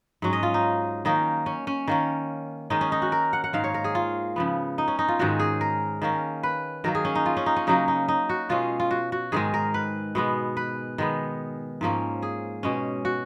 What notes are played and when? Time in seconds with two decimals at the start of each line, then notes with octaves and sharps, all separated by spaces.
0.22 G#2 F#3 C#4
0.33 D#5
0.43 F4
0.54 D#4
1.05 D#3 A#3 C#4 D#4
1.46 C#4
1.67 C#4
1.88 D#3 A#3 C#4
2.70 D#3 G#3 C#4 D#4
2.81 C#4
2.92 D#4
3.02 F#4
3.12 A#4
3.33 F#5
3.44 F#5
3.53 G#2 D#3 A#3 F5
3.64 C#5
3.74 A#4
3.84 G#4
3.95 F4
4.36 C#3 F3 B3
4.78 D#4
4.88 C#4
4.99 D#4
5.08 F4
5.19 G#2 D#3 G#3 C#4 F#4
5.39 G#4
5.61 A#4
6.02 D#3 A#3 C#4
6.43 B4
6.84 D#3 F#3 A#3 A#4
6.95 G#4
7.05 C#4
7.15 D#4
7.26 F4
7.37 C#4
7.46 D#4
7.56 C#4
7.67 C#3 F#3 A#3 C#4 D#4
7.88 D#4
8.08 D#4
8.29 F#4
8.49 B2 G#3 C#4 F4
8.80 F4
8.91 F#4
9.12 F#4
9.32 G#2 D#3 G#3 G#4
9.54 A#4
9.74 B4
10.15 B2 G#3 B3
10.57 B4
10.98 D#3 G#3 B3
11.81 G#2 F3 A#3 C#4
12.22 G#4
12.63 B2 G#3 C#4
13.05 F#4